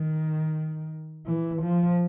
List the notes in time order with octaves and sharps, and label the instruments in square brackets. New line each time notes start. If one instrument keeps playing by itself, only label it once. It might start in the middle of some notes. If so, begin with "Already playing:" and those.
Already playing: [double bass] D#3
E3
F3